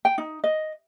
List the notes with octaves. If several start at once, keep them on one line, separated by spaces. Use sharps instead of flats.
G5
D#4
D#5